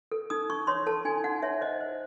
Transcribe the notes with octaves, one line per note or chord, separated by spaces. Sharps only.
A4
D#4 D#6
D#4 C#6
C#5 C6
A4 A5
D#4 G#5
D#4 F#5
C#5 E5
C5 D#5
C5